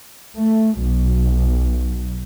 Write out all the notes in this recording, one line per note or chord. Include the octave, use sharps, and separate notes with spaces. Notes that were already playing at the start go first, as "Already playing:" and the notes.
A3
B1